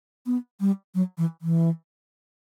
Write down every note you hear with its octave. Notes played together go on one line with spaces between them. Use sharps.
B3
G3
F#3
E3
E3